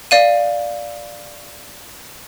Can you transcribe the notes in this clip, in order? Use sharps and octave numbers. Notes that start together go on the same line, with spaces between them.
D5 F5 D#7